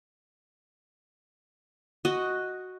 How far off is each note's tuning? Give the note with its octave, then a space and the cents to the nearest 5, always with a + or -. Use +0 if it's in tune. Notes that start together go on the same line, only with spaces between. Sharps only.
F#4 +0 D#5 +0